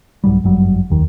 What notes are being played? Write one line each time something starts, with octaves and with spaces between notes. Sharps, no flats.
C2 G#2 F#3 G3
G1 F#2 F#3 G3
F1 D#2 D#3